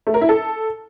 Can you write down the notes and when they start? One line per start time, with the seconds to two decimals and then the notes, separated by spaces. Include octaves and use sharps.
0.07 A3
0.14 A#4
0.21 E4
0.29 A4